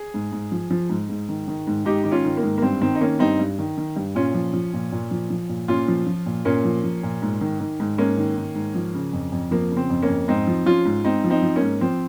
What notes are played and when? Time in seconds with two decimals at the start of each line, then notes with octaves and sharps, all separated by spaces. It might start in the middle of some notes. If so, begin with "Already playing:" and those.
Already playing: G#4
0.14 G#2
0.32 G#2
0.52 F3
0.71 F3
0.90 G#2
1.09 G#2
1.29 D#3
1.48 D#3
1.67 G#2
1.85 G#2 D#4 G4
2.04 D#3 D#4
2.12 C#4 F4
2.25 D#3
2.37 A#3
2.43 G#2
2.58 A#3
2.62 G2 C4
2.81 D#3 C4
2.95 D#4
3.01 D#3 A#3 C#4
3.19 G2 C4 D#4
3.39 G2
3.59 D#3
3.78 D#3
3.96 G2
4.15 A#2 C#4 F4
4.34 F3
4.53 F3
4.73 A#2
4.92 A#2
5.11 F3
5.30 F3
5.49 A#2
5.68 A#2 C#4 F4
5.88 F3
6.07 F3
6.26 A#2
6.45 A#2 A#3 C#4
6.65 F3
6.84 F3
7.03 A#2
7.22 G#2
7.41 D#3
7.60 D#3
7.80 G#2
7.98 G#2 A#3 C#4
8.18 D#3
8.37 D#3
8.55 G#2
8.75 F3
8.95 C#3
9.13 F2
9.32 F2
9.51 F3 A#3
9.71 C#3
9.77 C4
9.90 F2
10.03 A#3 C#4
10.09 F2
10.28 G#2 C4 D#4
10.47 F3
10.66 F3 C#4 F4
10.86 G#2
11.05 G#2 C4 D#4
11.24 F3
11.30 C4 D#4
11.43 F3
11.56 A#3 C#4
11.62 G#2
11.81 F3 C4